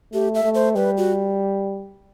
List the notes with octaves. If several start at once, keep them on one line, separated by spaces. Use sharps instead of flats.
A3 G4
E5
A3
C5
G3 B4
F#4